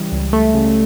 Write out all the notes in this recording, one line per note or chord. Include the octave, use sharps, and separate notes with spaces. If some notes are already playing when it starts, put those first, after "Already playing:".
Already playing: C#3 E3 G3
C#2
C#2 A3
C#3